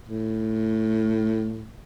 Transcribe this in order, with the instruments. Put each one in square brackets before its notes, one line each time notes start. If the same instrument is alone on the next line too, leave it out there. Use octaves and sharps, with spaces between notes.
[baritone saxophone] A2